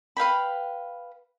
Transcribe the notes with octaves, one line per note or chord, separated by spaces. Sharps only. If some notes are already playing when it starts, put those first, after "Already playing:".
B4 F5 G5 B5